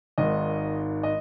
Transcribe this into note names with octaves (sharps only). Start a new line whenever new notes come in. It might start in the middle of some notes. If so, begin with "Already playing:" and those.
G#1 G#2 D#3 D#5
D#5